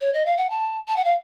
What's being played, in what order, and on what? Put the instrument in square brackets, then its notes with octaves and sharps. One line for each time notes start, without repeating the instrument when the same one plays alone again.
[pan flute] C#5
D#5
F5
F#5
A5
A5
F#5
F5